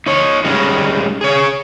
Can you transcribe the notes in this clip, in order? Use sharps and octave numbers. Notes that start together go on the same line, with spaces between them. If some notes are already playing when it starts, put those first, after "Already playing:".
D#4 C#5
G3 G#3 C#4 D#4 F#4
G#4 C#5